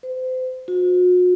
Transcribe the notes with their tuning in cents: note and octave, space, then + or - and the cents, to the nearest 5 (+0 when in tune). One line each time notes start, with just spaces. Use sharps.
C5 -35
F#4 -40